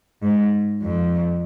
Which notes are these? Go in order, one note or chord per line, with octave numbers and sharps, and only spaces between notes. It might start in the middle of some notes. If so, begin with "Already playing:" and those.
G#2
F2